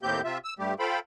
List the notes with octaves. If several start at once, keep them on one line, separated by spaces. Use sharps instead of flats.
D#2 A2 A#3 C4 G4 G6
C3 F4 E5
E6
G2 G3 A3 G4
F4 A4 C5 F5 G5 B5